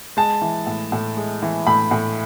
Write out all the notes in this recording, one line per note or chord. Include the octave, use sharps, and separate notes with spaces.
G#3 A5
E3
A2
A2
G#3
E3
A2 B5
A2